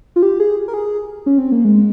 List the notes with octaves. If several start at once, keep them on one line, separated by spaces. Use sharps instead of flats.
F4
G4
G#4
A#4
G#4
C#4
C4
A#3
G#3